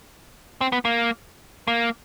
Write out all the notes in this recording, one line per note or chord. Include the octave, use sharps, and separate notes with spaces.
C4
B3
A#3
A#3